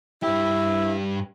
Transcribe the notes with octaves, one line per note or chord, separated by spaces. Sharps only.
G2 E4 G4